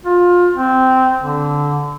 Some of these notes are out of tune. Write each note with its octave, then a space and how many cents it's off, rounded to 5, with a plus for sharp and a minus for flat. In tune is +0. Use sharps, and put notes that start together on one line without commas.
F4 +20
C4 -10
D3 -15